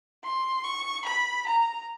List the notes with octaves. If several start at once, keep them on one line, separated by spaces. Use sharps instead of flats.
C6
C#6
B5
A#5